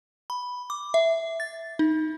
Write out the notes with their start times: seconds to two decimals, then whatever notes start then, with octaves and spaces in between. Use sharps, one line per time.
0.30 B5
0.70 D6
0.94 E5
1.40 A6
1.79 D#4